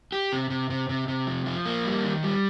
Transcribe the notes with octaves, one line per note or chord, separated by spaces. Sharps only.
G4
C3
C3
C3
C3
C3
F3
F3
A#3
G3
D#3
G3